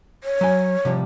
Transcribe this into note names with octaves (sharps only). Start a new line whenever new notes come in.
C#5
F#3 G#5
C3 F3 G3